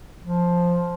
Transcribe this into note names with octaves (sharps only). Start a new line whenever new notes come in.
F3